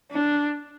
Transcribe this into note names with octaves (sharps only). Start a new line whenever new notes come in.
D4